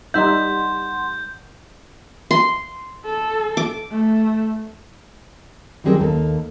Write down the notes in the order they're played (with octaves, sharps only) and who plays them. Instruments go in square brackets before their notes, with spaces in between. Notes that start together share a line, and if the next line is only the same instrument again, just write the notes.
[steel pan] G3 D#4 E5 [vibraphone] F#5 C6 [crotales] G6
[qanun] C6
[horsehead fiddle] A4
[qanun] D6
[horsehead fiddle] A3
[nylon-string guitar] D#3 F#3 G3 C4 G#4 A#4
D#2 A#3 A4